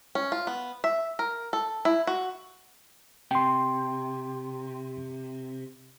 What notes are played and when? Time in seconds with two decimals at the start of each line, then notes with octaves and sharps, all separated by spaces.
0.15 C#4
0.32 F4
0.47 B3
0.84 E5
1.19 A#4
1.53 A4
1.85 E4
2.07 F#4
3.31 C3 G5 C6